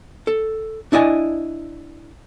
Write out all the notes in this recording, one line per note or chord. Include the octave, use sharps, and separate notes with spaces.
A4
D4 E4 D5 D#5 G#5